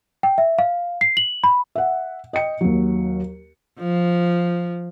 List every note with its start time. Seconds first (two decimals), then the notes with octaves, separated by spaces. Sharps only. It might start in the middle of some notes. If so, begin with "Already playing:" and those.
0.23 G5
0.38 E5
0.59 F5
1.01 C7
1.17 F#7
1.44 B5
1.75 E5 F#5
2.33 D#5 G5 C#7
2.61 D#2 F#3
3.80 F3